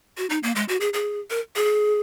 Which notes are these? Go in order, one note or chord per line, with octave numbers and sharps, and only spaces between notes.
F#4
D#4
A#3
G#3
F#4
G#4
G#4
A#4
G#4